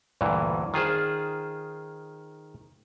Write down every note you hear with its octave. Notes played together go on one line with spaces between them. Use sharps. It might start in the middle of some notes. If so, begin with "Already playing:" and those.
D2 G2 A#2 E3
D#3 F4 G#4 C5